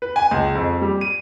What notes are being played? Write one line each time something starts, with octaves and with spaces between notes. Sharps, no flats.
B4
G#5
C#2
F2
G3
D#7